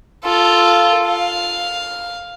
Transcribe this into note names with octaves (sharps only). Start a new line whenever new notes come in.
F4 A4
F5